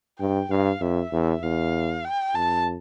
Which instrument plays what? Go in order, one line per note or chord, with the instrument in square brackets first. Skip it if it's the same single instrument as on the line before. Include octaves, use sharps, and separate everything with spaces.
[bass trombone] G2 [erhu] G5
[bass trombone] G2 [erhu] F5
[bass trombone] F2 [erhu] E5
[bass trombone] E2
[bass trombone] E2 [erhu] F5
[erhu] G5
[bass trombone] F2 [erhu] A5